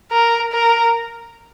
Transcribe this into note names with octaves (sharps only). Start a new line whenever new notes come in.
A#4
A#4